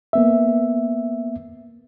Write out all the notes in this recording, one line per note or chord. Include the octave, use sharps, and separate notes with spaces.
A#3 B3 E5